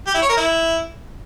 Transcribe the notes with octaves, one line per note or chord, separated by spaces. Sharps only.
G4
E4
C#5
A#4
E4